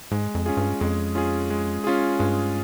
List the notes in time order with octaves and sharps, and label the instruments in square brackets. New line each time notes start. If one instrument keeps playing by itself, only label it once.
[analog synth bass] G#2 [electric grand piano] G#3
[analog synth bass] F2
[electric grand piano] C#4 F4 G#4
[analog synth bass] G2
[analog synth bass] F2 [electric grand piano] G#3
[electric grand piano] C#4 F4 G#4
G#3
C#4 F4 G#4
[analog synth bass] G2 [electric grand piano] G#3